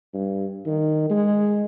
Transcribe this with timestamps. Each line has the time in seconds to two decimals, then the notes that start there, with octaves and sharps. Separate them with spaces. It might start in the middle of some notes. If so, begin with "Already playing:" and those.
0.14 G2
0.66 D#3
1.11 G#3